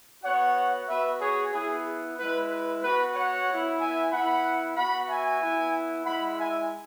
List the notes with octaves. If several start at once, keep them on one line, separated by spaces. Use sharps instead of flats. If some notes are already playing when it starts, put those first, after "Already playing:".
B3 F#4 C#5 F#5
B3 F#4 B4 E5
G#4 C#5
B3 E4 G#4
G#3 E4 B4
B4
B3 F#4 B4
C#5 F#5
B3 E4
E5 G#5
B3 E4 F#5 B5
B3 F#4 F#5 B5
E5 G#5
B3 E4
G#3 E4 F#5 B5
E5 G#5